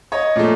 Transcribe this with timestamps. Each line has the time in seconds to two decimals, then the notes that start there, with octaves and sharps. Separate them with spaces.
0.12 C#5 D#5
0.36 A#2 F3 A3